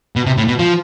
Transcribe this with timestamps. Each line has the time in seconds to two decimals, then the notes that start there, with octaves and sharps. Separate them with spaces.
0.16 B2
0.26 C3
0.37 A2
0.48 B2
0.59 F3